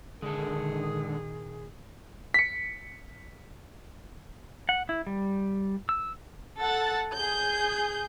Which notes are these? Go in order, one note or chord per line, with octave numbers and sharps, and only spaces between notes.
A#2 D3 D#3 G#3 G#4 A4
B6 C#7
F#5
E4
G3
E6
A4 F#5 A6
G#4 G6